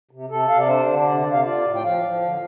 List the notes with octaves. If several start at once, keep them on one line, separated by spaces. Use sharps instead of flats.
C3
C3 A4
C3 F5
D5
D4 C5
D3
C3 D5
D5
C3
F5
F4 D5
A2
G5
F3 F5
F3
D3